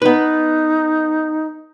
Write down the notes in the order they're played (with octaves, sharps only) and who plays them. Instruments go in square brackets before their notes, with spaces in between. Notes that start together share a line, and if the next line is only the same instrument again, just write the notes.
[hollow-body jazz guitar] B3 B4 [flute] D#4